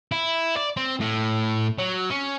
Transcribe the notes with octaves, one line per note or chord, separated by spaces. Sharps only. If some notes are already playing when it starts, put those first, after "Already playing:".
E4
D5
C4
A2
F#3
C#4